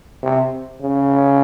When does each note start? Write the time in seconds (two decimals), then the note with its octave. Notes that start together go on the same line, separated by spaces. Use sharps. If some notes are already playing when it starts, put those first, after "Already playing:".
0.23 C3
0.82 C#3